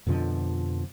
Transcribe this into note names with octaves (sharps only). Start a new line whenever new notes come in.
F2 B2 D3 F3